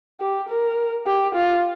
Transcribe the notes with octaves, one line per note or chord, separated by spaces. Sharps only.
G4
A#4
G4
F4